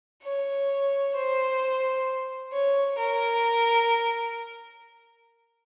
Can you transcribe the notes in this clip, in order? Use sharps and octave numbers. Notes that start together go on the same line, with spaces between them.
C#5
C5
C#5
A#4